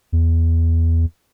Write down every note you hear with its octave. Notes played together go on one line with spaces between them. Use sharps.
E2